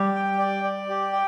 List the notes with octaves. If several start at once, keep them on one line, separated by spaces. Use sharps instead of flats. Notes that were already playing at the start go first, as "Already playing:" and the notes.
Already playing: G3 G4
G5
D5
D5
G4
G5